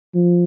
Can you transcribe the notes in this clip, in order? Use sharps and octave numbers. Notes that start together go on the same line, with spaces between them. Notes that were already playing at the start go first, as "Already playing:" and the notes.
F3